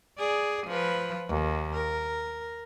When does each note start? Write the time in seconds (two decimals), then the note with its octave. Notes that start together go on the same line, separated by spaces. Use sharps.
0.18 G#4 D5
0.67 F3 B4
1.29 D#2
1.74 A#4